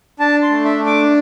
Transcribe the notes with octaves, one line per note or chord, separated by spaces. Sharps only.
D4 A5
C6
A3
E5
D4
D6